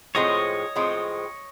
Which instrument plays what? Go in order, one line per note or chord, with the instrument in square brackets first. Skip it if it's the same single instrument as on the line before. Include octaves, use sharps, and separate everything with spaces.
[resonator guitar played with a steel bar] A2 F3 G#3 C4 [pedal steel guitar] C#5 D#5
[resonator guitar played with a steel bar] A2 F3 G#3 C4